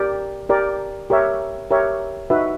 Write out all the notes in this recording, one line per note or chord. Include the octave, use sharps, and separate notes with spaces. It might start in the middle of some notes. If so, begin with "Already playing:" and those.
Already playing: G4 A#4 D5
G4 A#4 D5
G4 A#4 C#5 E5
G4 A#4 C#5 E5
D#4 F#4 B4 E5